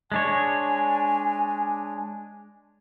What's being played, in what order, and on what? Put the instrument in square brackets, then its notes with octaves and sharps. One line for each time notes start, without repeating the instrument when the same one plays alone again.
[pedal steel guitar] G#3 D4 C#5 [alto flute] G#5